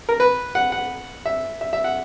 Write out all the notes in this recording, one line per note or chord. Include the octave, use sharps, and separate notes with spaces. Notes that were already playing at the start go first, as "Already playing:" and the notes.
A#4
B4
F#5
F#5
E5
E5
E5
F#5